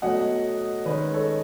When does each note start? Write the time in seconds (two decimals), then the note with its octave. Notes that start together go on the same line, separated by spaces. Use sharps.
0.02 B2 F#3 A3 D#5 F#5
0.85 D#3 G#3 C#4 B4 D#5
1.13 A4 C#5